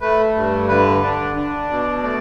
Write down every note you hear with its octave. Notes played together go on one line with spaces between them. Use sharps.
A3 B4
G2
D3 B4
D4
D4
B2
A3 D5